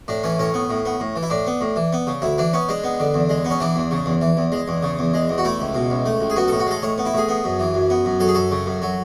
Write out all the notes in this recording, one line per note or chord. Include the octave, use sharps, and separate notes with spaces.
A2 D4
E3 C#4
A2 C#4
B3
A2
B3
A2
E3
E4
A2 D4
B3
A2
E3
B3
C#3
D2 E4
E3 D4
B3 C#4
G#3 D4
B3
D3
E2
G#3
B3
C#4
E3 D4
E2
C#3
E2
E3
E2
G#3
E2
C#3
E2
G#3
E2
F#4
A3 E4
C#2
B2
C#2
A3
C#2
G#4
B3 F#4
A2 A4
F#4
G#3 A4
A2 C#5
B3
E4
A2 G#4
B3
F#2
E3
F#2
B3
F#2
F#3 A4
G#4
F#2 A4
C#3
F#2
F#3